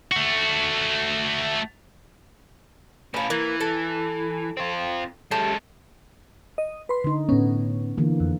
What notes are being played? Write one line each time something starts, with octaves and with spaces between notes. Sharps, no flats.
A3 F#4
C#4 E4 B4 F5
E3 A#3
A4
C4 F4
G#3 A3 C#4 G4 A4
D#5
B4 C6
D3 D#4
A2 B3 C#4
D3 E3 A#3
F2